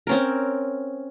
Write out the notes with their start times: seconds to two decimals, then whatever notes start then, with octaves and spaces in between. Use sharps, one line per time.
0.07 C4 C#4 A#4